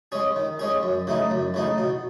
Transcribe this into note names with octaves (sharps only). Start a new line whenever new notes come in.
G#3 C#4 G#4
D#3
G#3 C#4 G#4
F#2
C#3 E3 A3 D#4
F#2
C#3 E3 A3 D#4
B2